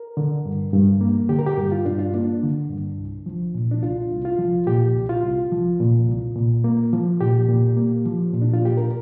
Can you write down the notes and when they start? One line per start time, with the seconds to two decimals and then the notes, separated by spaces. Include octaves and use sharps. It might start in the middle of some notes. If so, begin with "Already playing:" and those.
Already playing: A#4
0.17 D3
0.46 G2
0.74 G2
1.01 A#3
1.29 D3 G4
1.39 A#4
1.47 G4
1.58 G2
1.72 F4
1.86 G2 D4
1.98 F4
2.14 A#3 D4
2.42 D3
2.70 G2
2.98 C2
3.26 F3
3.55 A#2
3.71 D4
3.82 C2 F4
4.11 C2
4.25 F4
4.39 F3
4.67 A#2 G4
4.95 C2
5.09 F4
5.24 C2
5.52 F3
5.80 A#2
6.07 C2
6.36 A#2
6.64 A#3
6.93 F3
7.21 A#2 G4
7.49 A#2
7.76 A#3
8.05 F3
8.33 A#2
8.42 D4
8.53 F4
8.62 A#2 G4
8.77 A#4